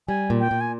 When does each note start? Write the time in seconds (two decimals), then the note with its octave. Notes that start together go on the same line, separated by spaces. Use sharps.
0.08 G3 G#5
0.30 A#2
0.40 G5
0.51 A#2
0.61 G#5